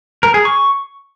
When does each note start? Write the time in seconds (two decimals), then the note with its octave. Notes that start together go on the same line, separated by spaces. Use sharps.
0.23 A#4
0.34 G#4
0.45 C#6